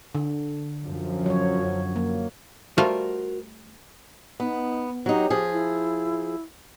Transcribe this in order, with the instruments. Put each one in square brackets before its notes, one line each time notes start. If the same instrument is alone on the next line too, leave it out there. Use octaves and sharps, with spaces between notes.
[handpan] D3
[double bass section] F#2 F3
[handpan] F#3 C#5
A#3
[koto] G3 A3 F4 [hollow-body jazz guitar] F#4 A#4 C5
[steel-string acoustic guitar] B3 [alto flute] D#4
[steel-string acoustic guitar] F#3 D#4 [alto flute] G4
[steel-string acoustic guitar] F3 G#4
[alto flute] E4